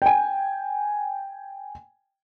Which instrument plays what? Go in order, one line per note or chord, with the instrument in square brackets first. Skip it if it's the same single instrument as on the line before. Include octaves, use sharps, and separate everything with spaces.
[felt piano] G5 G#5